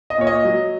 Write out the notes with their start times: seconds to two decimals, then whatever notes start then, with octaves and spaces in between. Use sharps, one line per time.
0.10 D#5
0.18 A#2 C#5
0.27 D#5
0.45 F#3